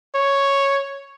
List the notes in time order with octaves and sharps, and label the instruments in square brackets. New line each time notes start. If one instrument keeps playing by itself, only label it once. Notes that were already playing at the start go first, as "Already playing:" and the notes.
[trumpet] C#5